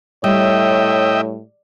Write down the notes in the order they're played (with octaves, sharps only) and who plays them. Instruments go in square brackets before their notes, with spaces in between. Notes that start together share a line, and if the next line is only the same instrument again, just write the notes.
[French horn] A2 [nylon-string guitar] G3 [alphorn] C#5 [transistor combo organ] D#5 E5 G5